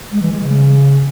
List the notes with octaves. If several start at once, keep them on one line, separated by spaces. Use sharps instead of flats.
G#3
E3
G#3
C#3